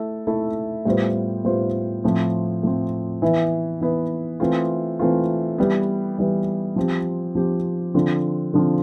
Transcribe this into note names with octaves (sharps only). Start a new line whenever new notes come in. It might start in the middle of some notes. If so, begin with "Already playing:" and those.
Already playing: A3 E4 A4 E5
A3 E4 A4 E5
A2 G3 B3 F4 C5
A2 G3 B3 F4 C5
A2 F3 C4
A2 F3 C4
E3 B3 E4
E3 B3 E4
E3 A3 C4 F4
E3 A3 C4 F4
E3 G3 B3
E3 G3 B3
F3 C4 G4
F3 C4 G4
D3 F3 C4 F4
D3 F3 C4 F4